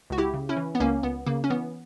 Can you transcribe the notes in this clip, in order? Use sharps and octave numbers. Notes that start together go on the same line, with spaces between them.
C#2 F#4
E4 G4
C#3
C#4 E4
E3
B3
C#2 A#3 C#4
C#2 B3
C#3 A#3
C#4
E3 B3